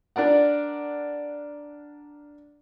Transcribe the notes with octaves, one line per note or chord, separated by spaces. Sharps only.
D4 A#4 D5 F#5